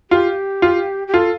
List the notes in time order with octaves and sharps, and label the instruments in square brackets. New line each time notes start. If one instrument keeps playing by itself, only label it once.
[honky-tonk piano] F4 [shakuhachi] G4
[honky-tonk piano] F4
[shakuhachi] G4
[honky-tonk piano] F4 [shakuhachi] A4